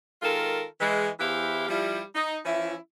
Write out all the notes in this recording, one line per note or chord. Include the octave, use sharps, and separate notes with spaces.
D#3 G#3 F4 A4 A#4
E3 G#3
E2 E3 E4 G4 C5 F5
F3 G3 E4
D#4
E3 F3 C#4 E4